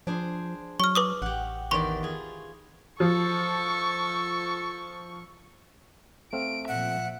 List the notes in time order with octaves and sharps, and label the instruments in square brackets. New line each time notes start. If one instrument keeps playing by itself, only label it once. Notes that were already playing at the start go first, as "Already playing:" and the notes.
[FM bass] F3 [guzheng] D4 G#4 C5
[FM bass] F#3 [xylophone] C#6 F6
[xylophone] B4 D6 D#6
[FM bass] A1 [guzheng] G4 F#5
[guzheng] E2 D#3 D5 [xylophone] C6 C#6
[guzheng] F4 G#4
[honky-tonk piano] F3 [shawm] A4 [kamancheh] C#6
[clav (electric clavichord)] A3 C4 F5 [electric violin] D7
[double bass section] A#2 F3 [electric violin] E5 [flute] F#5